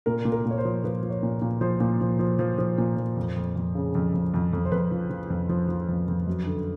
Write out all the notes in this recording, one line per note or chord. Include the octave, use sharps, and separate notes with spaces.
A#2 A#4
A#2
A#4
A#2
C#5
C5
F3
F3 B4
F3
C#5
A#2
A#2
F3 C5
A#2
F3
F3
F3
F3
A#2
F3
F2
F2
F2
C#3
F2
F2
F2
F2
C5
F2 B4
F3
F3
F2
F3
F3
F2
F2
F#2
D3